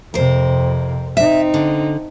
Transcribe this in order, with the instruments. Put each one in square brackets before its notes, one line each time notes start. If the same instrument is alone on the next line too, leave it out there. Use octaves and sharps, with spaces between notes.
[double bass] F2 C3 [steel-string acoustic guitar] A#4 C5
[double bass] C4 D#4 [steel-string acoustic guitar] E5
[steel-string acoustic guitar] D3